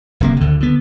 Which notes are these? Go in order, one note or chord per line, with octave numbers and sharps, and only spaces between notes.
D1 C3 A#3
D2 D3
D3 B3